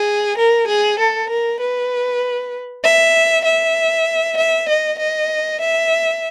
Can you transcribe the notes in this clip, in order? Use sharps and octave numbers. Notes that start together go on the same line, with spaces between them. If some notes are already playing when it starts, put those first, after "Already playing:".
Already playing: G#4
A#4
G#4
A4
A#4
B4
E5
E5
E5
D#5
D#5
E5